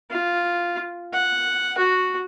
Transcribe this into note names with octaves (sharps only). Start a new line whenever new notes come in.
F4
F#5
F#4